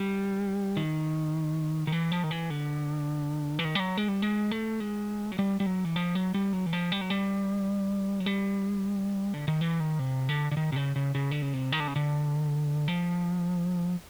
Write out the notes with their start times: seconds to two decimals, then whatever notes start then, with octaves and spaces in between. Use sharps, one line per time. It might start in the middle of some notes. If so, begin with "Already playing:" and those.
Already playing: G3
0.77 D#3
1.87 D#3
1.92 E3
2.11 F3
2.23 D#3
2.31 E3
2.50 D3
3.59 E3
3.65 D#3
3.75 G3
3.80 F#3
3.97 G#3
4.08 G3
4.22 G#3
4.51 A3
4.80 G#3
5.32 F#3
5.39 G3
5.60 G3
5.66 F#3
5.85 E3
5.96 F3
6.15 F#3
6.34 G3
6.53 F#3
6.66 E3
6.73 F3
6.92 G3
7.01 F#3
7.10 G3
8.20 F#3
8.26 G3
9.34 D3
9.48 D#3
9.61 E3
9.80 D#3
9.99 C3
10.29 D3
10.51 D3
10.57 D#3
10.72 C3
10.76 C#3
10.96 C#3
11.15 C#3
11.31 D3
11.42 C#3
11.53 C3
11.72 D#3
11.80 D3
11.88 C#3
11.96 D3
12.88 F3